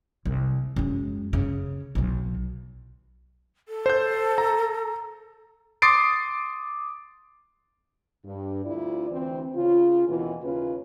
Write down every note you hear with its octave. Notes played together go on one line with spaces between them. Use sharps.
C2
F#2 G#3
C#3
B1 F#3
A4
C5 G6
A#5
C6 D6 D#6 A6 C7 D7
G2
D2 E4 F4 D5
D2 E3 C4
C#3 F4
D#2 B2 E3
D#2 C#3 C#4 F4 B4